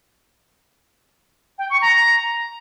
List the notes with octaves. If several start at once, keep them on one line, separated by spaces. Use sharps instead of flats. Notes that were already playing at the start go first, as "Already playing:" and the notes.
G5
C#6
A#5